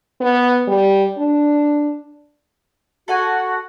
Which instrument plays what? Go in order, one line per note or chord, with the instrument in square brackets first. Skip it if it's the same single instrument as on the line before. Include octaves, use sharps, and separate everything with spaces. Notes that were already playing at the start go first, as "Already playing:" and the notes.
[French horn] B3
G3
D4
[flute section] F#4 [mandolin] A4 F#5 G#5